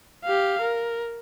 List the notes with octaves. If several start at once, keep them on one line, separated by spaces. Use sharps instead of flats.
G4 F5
A#4